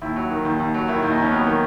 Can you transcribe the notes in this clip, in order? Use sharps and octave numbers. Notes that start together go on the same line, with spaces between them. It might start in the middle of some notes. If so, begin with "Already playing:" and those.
D#2 E4
F#3
D#3
D#2
D#2
F#3
D#3 E4
D#2
D#4
D#2 C#4
F#3 B3
D#3